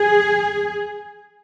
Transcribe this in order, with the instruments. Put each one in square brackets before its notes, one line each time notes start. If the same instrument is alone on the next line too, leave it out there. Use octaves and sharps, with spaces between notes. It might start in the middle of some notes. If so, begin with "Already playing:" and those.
Already playing: [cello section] G#4